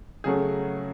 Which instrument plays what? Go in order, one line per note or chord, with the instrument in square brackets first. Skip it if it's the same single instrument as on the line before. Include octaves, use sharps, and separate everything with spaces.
[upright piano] C#3 F#3 A3 G#4